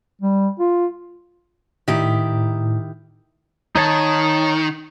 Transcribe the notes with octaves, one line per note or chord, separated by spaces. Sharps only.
G3
F4
A2 D#3 E4 G4
D#3 D#4 C#5 A5